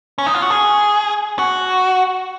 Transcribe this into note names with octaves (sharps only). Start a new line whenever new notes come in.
C#4
D#4
F4
F#4
G#4
F#4